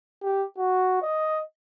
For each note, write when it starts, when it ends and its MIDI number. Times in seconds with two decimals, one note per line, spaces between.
0.23 0.45 67
0.58 1.01 66
1.02 1.39 75